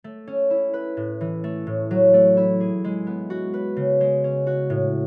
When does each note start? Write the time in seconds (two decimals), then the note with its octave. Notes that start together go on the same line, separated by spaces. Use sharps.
0.04 A3
0.27 C#4
0.50 E4
0.74 B4
0.97 A2
1.21 E3
1.44 A3
1.67 A2
1.91 F#3
2.14 A3
2.37 E4
2.60 G#4
2.84 G#3
3.07 B3
3.30 F#4
3.54 B4
3.77 C#3
4.01 G#3
4.24 C#4
4.47 F#4
4.70 A2